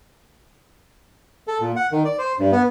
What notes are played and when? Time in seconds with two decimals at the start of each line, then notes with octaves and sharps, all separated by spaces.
1.47 A4
1.61 A#2
1.76 F#5
1.92 D#3
2.05 D5
2.18 C5
2.39 G2
2.52 B3